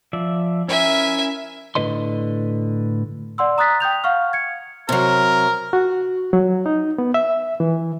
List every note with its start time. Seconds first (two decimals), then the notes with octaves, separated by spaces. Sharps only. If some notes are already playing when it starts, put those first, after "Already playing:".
0.13 F3 D5 E5
0.68 C#4 E4 A#4 E5 G#5
1.75 A2 D3 B4 D#5 C6
3.38 D5 F#5 C6 E6
3.58 A#5 D#6 F#6 A6 B6
3.80 G5 D#6 G6 F7
4.04 F5 F#5 C#6 F6
4.33 G#6 C#7
4.89 C3 F#3 A#4
5.73 F#4
6.33 F#3
6.66 D#4
6.98 B3
7.14 E5
7.60 E3